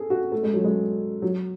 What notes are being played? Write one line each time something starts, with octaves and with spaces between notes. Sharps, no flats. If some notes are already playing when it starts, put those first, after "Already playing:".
Already playing: G#4 A4
F#4
A3
G#3
F#3
G#3
F#3